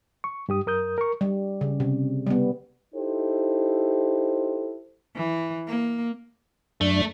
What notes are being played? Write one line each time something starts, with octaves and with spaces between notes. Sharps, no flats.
C#6
G2 G4 D#6
F#2 A#4 D#6 G6
A#4 C#6
G3
C#3
C3
G3 B3
D#4 E4 G4 A4 C5
E3
A#3
F#2 A3 D4